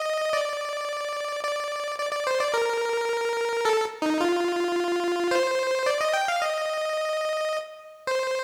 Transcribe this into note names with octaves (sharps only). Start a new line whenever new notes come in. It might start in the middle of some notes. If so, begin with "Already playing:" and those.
Already playing: D#5
D5
D5
D5
D5
C5
D5
A#4
A4
D#4
F4
C5
D5
D#5
G5
F5
D#5
C5